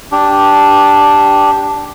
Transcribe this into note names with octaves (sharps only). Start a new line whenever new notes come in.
D4 G4